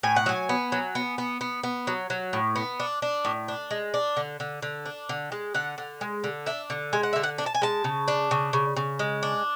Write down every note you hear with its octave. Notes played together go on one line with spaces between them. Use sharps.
A2 G#5
F#5
F#3 G#5
B3
F#3
B3
B3
B3
B3
F#3
F#3
A2
B3
D4
D4
A2
D4
G#3
D4
D3
D3
D3
D4
D3
G#3
D3 F#5
D3
G#3
D3
D4 E5
D3
G#3 G#5
F#5
D3 E5
F#5
D4
A5
G#5
G#3 A5
C#3
D4
C#3
C#3
C#3
G#3
D4